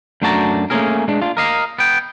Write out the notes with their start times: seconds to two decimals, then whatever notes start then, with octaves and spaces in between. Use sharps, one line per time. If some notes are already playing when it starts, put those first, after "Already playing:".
0.22 F#2 A3 D4 F#4 A5 A#5
0.70 A3 A#3 C4 C#4 G#4 A#4
1.08 G#3 D4
1.22 D4 F4
1.37 A#4 D#5 F5
1.79 B3 G5